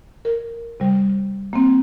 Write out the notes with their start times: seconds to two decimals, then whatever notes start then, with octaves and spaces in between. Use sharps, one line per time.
0.25 A#4
0.80 C3 G3
1.53 A#3 C4